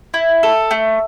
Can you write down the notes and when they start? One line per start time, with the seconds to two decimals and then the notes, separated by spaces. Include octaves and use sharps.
0.14 E4
0.43 A4
0.71 A3